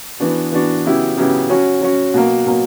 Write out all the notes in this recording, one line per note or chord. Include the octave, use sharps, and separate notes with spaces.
E3 B3 D4 F#4
E3 B3 D4 F#4
C#3 F#3 B3 E4 G4
C#3 F#3 B3 E4 G4
F#3 C#4 F#4
F#3 C#4 F#4
B2 F#3 A#3
B2 F#3 A#3